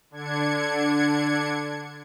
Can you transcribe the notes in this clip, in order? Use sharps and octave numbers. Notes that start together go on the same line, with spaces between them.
D3 D4 G#6 C#7